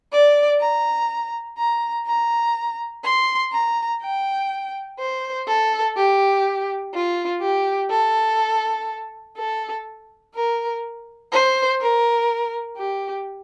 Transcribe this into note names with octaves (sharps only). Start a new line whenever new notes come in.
D5
A#5
A#5
A#5
C6
A#5
G5
C5
A4
G4
F4
G4
A4
A4
A#4
C5
A#4
G4